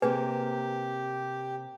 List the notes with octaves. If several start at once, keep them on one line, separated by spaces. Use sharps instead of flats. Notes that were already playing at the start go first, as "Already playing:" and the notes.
C3 A#3 C4 G4 G#4 B4 G#5